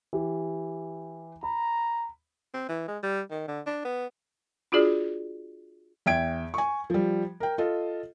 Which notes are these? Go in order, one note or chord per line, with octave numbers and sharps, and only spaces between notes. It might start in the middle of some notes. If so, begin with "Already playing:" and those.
E3 G4
A#5 B5
C4
E3
G#3
G3
D#3
D3
D4
B3
D4 F4 F#4 G#4 D5
E2 E5 G5 G#6 D7
G#5 C#6
F3 G3
A#4 G5
F4 A4 D#5